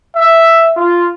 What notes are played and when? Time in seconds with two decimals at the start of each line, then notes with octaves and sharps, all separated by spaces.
0.16 E5
0.76 F4